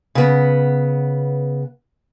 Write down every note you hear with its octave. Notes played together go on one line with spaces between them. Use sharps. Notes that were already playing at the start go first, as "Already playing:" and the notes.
C#3 B3